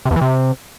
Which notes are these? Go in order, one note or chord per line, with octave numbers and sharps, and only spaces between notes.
C3
E2
E3
C3